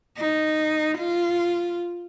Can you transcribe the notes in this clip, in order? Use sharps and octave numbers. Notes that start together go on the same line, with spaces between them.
D#4
F4